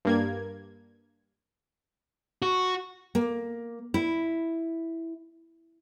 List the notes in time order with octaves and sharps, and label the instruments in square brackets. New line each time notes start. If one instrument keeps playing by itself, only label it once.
[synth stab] G2 A#3 G#6
[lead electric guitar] F#4
[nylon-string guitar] A#3
E4